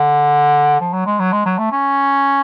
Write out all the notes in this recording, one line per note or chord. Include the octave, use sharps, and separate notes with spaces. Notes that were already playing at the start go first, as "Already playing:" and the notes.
Already playing: D3
F3
F#3
G#3
F#3
G#3
F#3
A3
C#4